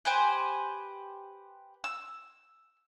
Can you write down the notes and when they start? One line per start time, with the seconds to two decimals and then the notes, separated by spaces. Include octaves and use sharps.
0.05 G4 B4 C5 G#5
1.84 E6